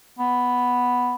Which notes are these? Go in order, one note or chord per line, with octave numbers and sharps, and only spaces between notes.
B3